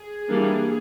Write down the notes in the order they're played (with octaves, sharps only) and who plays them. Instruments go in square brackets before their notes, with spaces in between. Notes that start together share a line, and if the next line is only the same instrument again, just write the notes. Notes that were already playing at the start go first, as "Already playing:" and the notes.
Already playing: [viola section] G#4
E3 G3 A#3 D4